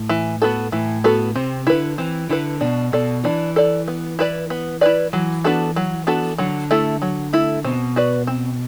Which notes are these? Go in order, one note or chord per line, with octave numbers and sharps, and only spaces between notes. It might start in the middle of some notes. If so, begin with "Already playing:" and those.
Already playing: A2
E3
B3 F#4 A4
A2 E3
B3 F#4 A4
C3 C4
D3 E4 B4
E3 C4
D3 E4 B4
B2 D4
B2 A4 D5
E3 D4
A4 D5
B3
E4 B4 D5
B3
E4 B4 D5
E3 F#3
B3 D4 F#4 A4
F#3
B3 D4 F#4 A4
D3 F#3
A3 E4 A4
F#3
A3 E4 A4
B2 C4
F#4 B4 D5
C4